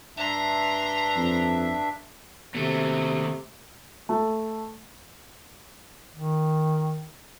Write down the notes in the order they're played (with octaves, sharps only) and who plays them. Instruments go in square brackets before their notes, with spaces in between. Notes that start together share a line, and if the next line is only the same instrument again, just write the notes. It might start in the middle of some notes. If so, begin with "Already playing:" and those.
[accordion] G2 D4 E5 [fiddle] A#5 C6
[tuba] F2
[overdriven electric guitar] D#2 A3 [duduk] C3
[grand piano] A3
[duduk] D#3